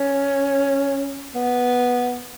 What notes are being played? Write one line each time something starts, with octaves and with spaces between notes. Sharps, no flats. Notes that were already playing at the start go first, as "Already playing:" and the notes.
Already playing: C#4
B3